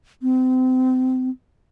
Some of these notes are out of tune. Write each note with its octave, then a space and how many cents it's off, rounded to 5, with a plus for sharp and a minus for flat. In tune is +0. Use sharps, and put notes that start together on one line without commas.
C4 -30